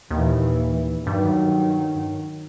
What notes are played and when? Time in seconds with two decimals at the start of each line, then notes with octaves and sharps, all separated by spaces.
0.11 D#2 A#2 E3
1.07 G2 D#3 F#3